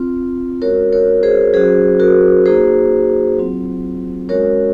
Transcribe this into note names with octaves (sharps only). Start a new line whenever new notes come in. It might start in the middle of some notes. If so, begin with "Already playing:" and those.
Already playing: C4 F4
G#3 C#4 F#4 A#4 C#5
A#4 C#5
G#4 C5
F#3 C#4 F#4 G#4 C5
F#4 A#4
A#3 D#4 F#4 G#4 C5
F#3 C4 F4
G#3 C#4 F#4 A#4 C#5